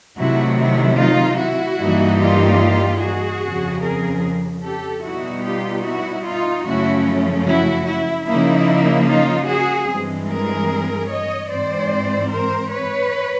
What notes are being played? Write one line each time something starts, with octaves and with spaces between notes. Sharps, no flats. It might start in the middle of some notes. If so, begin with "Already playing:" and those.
C3 D#3 F#3 A3 E4 F#4
E4
D#4 F4
E4 F#4
G2 E3 G3 A#3 D#4
F4 G4
F#4 G#4
F2 C#3 F3
G#4 A#4
G4 A4
B2 G3 B3 D#4 E4 F#4
F4 G4
E4 F#4
D#4 F4
F#2 C#3 F3 A3 C#4 E4 F#4
E4 F#4
E4
C#3 F3 A#3 D#4 E4
D#4 F4
F#4 G#4
G2 E3 G#3 C4
G#4 A#4
C#5 D#5
G#2 E3 G#3 C4 C5 D5
A#4 C5
B4 C#5